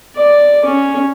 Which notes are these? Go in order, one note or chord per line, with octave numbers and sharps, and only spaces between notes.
D5
C#4